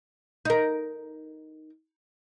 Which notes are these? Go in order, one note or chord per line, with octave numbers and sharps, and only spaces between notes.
D#4 A#4